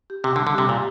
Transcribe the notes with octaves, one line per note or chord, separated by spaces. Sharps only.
G4
C3 G4
D3
G3
D3
C3 G4
A#2 G4